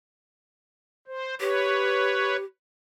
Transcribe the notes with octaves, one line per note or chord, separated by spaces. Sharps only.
C5
G4 B4 C#5